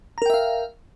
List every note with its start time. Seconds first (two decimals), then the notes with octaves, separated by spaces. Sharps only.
0.18 A#5
0.22 A#4
0.26 G5
0.30 E5
0.34 F5